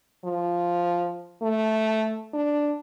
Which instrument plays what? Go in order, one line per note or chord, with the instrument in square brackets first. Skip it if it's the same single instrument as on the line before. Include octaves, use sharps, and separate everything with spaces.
[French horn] F3
A3
D4